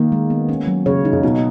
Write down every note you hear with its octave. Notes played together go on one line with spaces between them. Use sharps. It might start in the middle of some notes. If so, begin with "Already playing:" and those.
Already playing: D#3 A#3
G#3
B3
C#4
F#3
C#3 C#5
D#4
C#3
B2 D#4